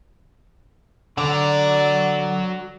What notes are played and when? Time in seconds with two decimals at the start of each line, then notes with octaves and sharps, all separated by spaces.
1.17 D3 F#3 D5 A#5